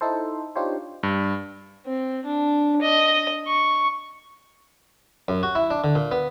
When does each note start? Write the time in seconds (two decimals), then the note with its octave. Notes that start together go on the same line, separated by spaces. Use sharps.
0.01 D#4 E4 A4 C5
0.55 D4 D#4 F4 G4 C5 C#5
1.03 G2
1.86 C4
2.25 D4
2.82 D#5
3.47 C#6
5.28 F#2
5.43 F#4
5.55 E4
5.71 D4
5.84 D3
5.95 A#2
6.11 B3